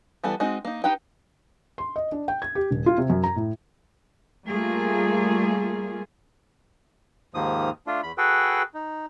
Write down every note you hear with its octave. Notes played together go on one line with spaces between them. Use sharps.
E3 G3 B3 A4
G#3 C4 D#4 F#4
A#3 D#4
D#4 G4 B4 G5
C6
D#5
D4
G5
G#6
G4
D#1
F4
C3
F#2
A#5
A2
G3 A3 A#3 F4 G#4
D#2 G#2 D#3 F3 A#3 D#6
A3 D4 F4
E2 B5
F#4 G#4 A4 B4 G5
D#4